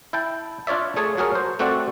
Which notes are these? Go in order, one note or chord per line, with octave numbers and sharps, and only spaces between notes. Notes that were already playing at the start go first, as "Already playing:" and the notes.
E4 G5 A5
D4 F4 C#5 D5 E5
A3 G#4 C#5 G#5 A5
F#3 F#4 G#4 A#4 C#5
C5
A3 C4 F#4 A4 D5 F#5